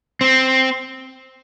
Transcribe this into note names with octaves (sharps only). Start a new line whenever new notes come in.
C4